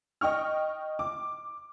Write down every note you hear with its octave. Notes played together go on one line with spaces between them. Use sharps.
D#5 G5 C#6 F6
D6